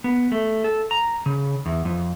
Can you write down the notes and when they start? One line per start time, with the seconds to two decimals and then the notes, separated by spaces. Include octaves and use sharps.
0.04 B3
0.32 A3
0.64 A4
0.91 A#5
1.26 C#3
1.66 E2
1.85 F2